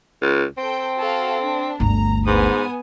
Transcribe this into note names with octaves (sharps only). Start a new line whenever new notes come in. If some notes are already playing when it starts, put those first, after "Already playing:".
C#2
C4 A4 G5
F#4 A4 F5
D4
G1 D2 A#5
G#2 B3 G#5 D#6